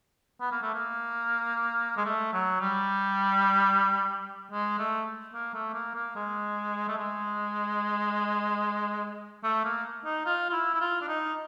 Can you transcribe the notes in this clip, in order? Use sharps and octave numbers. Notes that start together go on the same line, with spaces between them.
B3
A#3
A3
A#3
G#3
A3
F#3
G3
G#3
A3
A#3
A3
A#3
A#3
G#3
A3
G#3
A3
A#3
D#4
F4
F4
E4
E4
F4
D4
D#4